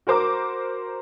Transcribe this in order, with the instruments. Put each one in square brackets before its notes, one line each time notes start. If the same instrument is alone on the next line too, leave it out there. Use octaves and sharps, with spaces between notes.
[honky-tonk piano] F#4 A#4 C5 D6